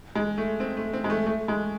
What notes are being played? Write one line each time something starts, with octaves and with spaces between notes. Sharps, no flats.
G#3
A3
C4
A3
C4
G#3
A3
A3
G#3